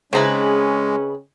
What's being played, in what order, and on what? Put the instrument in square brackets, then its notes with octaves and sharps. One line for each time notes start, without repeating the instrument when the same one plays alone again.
[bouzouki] C#3 B4 [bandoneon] G#3 [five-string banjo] C4 D#4 E4 [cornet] C#4